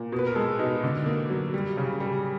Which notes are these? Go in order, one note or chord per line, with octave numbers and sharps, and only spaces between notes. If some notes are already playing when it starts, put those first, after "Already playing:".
Already playing: A#2
B2
B4
A#4
G#3 A4
B2 D#4
D3
A#3
F#3
G3
C#3
G3